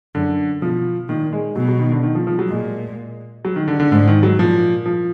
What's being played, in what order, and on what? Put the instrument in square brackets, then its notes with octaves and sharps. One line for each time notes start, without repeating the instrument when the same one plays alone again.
[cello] F#2 [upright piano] D3
[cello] B2 [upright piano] F3
[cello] A#2 [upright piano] D#3
[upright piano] G#3
[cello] B2 [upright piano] F#3
[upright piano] F#3
D#3
D3
D#3
F3
F3
F#3
[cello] A#2 [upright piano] G#3
[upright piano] F#3
D#3
D3
D3
[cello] G#2 [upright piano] D3
[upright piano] D#3
F#3
[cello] A#2 [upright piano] F3
[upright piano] F3